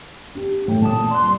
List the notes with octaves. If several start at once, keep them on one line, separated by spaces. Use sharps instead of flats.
D4 G4
A2 G5
A#2 A5 D#6
D5 C6 F#6
C2